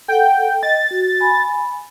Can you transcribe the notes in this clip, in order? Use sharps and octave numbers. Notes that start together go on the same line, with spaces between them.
A4 F#5 G5
D#5 A6
F#4
G#5 B5